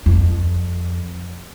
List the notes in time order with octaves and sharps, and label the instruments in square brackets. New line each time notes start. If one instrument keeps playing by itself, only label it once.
[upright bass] F2